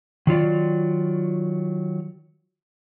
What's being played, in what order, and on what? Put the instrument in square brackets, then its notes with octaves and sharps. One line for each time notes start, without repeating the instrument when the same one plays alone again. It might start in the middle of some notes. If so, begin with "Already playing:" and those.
[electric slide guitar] D#3 F#3 F4 D5